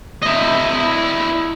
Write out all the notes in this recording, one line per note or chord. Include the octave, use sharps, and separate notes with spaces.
E4 D#5